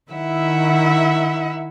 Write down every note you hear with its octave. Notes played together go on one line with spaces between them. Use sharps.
D#3 E4 E5 F#5